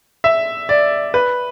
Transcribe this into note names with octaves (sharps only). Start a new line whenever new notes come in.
E5
D5
B4